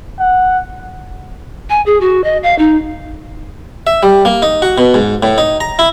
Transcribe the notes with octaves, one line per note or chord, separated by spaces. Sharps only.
F#5
G#5
G#4
F#4
D#5
F5
D#4
E5
G3
A#3
D#4
F#4
B2
G#2
A2
D#4
A#5
E4